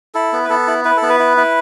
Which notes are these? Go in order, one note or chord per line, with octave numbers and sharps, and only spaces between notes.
E4 A4
B3
B4
B3 A4
E4
E4 B4
A4
B3
B4
E4
E4